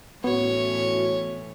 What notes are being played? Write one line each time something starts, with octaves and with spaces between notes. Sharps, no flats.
A2 E3 B3 C#4 F#4 C#5